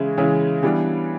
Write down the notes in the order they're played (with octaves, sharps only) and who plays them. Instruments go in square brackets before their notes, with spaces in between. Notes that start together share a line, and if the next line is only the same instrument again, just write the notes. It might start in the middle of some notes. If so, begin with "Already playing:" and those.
Already playing: [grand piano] C#3 E3 G#3 C#4 E4
C#3 E3 G#3 C#4 E4
E3 G3 B3 D4